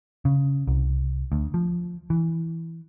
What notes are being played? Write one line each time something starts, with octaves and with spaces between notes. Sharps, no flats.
C#3
C2
D2
F3
E3